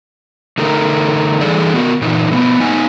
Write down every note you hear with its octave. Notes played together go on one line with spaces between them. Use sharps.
D3 A3 D#4 A#4
E3 G3 D#4 G#4 A4 D5
B3 F#4 A#4
A#2 E3 D#4
B2 F3 B3
B3 D#4 F#5 G#5